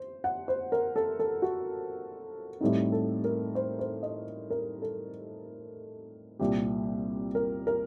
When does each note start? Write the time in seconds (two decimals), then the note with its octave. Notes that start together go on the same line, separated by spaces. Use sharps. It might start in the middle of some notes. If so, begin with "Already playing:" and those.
Already playing: C5
0.24 F#5
0.48 C5
0.72 A#4
0.96 A4
1.19 A4
1.42 F#4
2.61 A2 G3 C4 D#4 G4
2.92 A4
3.24 A#4
3.55 C5
3.79 C5
4.03 D#5
4.50 A#4
4.82 A4
6.40 C2 A#2 G3 G4
7.35 A#4
7.67 A#4